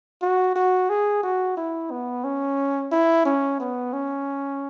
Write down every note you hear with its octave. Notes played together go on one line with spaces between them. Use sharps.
F#4
F#4
G#4
F#4
E4
B3
C#4
E4
C#4
B3
C#4